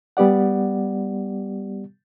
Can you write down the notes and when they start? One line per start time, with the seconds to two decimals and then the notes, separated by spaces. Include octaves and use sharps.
0.17 G3 B3 G4 D5 F#5